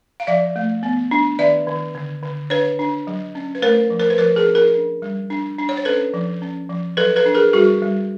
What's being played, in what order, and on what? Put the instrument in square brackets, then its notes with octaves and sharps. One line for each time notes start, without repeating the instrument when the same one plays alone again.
[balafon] F5
F3 D5 E5
A3
B3
D4
D#3 D5 E5
D#3
D3
D3
D4 B4 C#5
D4
F#3
C#4
B4
A3 A#4 C5
F3
A#4 C5
B4
F3 A#4 C5
G#4 A#4
C#4
G#4 A#4
D4
G3
D4
D4
C#5
C5
C#4 A4 B4
F3
C#4
F3
F#3 A4 B4
A4 B4
D4
G#4 A#4
G3 F#4 G#4
G3